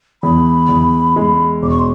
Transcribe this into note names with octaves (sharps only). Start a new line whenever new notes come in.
E2 B5
E2
G#3
E1 D6
C#6
C6